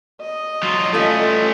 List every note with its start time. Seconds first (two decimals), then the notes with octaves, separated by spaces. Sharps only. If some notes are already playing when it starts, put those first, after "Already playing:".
0.21 D#5
0.63 F#3 F4
0.93 G3 A3 C#4 F4 A4